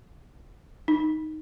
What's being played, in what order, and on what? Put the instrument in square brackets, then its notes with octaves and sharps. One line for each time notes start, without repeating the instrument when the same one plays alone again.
[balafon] D#4